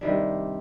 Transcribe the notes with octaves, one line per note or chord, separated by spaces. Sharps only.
C3 D#3 G3 D4